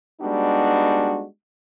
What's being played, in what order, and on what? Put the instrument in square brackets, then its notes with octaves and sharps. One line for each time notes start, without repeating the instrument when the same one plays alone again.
[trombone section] G3 G#3 B3 D4 D#4 F#4